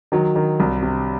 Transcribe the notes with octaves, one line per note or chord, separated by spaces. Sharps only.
D#3 F#3
D#3
C2
C3